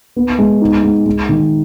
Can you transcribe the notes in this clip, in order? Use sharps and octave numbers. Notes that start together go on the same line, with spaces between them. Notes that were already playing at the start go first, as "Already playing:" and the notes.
B3
G#3
D#4
G#3
G#3
D#3